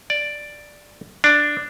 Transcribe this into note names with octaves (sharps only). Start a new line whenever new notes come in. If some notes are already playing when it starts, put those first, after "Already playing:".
D5
D4